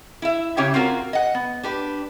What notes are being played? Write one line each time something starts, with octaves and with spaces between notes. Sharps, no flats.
E4 E5
C#3 C#4 G4 C#5 E5 G5
C4 F4 F#4 A#4
D#5 F#5
B3
D4 G4 B4